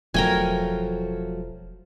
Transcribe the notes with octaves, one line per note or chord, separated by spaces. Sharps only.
E1 F3 F#3 A3 A#4 G5 G#5